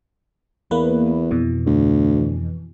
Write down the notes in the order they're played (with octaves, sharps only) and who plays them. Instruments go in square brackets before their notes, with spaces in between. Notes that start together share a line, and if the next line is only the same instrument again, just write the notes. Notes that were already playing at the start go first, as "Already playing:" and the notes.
[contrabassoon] E2 [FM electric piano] A#3 B4
[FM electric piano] F2 B2 E3
[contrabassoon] D2